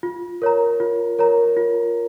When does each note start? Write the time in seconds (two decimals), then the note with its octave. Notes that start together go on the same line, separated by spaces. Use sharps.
0.03 F4
0.42 A#4 C#5 A#5
0.80 F4
1.19 A#4 C#5 A#5
1.57 F4